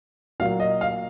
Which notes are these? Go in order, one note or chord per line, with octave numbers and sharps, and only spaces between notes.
A#2 F#3 A#3 F5
D#5
F5